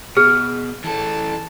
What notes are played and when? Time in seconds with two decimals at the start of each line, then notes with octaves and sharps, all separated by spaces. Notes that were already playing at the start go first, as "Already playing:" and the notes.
0.17 B2 G#4 F6
0.84 E3 A4 A5